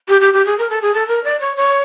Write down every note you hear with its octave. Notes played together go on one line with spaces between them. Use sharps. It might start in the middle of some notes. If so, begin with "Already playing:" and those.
G4
G4
G4
G#4
A#4
A4
G#4
A4
A#4
D5
C#5
C#5